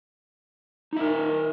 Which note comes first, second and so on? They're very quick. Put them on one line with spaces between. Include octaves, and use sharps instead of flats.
D#4 E5 A#4